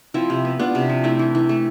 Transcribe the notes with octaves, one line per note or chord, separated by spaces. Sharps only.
F3 C4 E4
C3
B3
B3 D4 F4
C3
F3
A3 C4 E4
E3
E3
A3